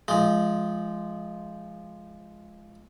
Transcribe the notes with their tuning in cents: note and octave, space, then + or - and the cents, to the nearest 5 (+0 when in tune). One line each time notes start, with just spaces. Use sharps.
F3 -15 G#3 +5